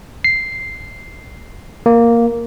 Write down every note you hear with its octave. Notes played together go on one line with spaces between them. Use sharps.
C7
A#3